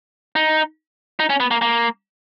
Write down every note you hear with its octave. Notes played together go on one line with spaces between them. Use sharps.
D#4
D#4
C#4
B3
A#3
A#3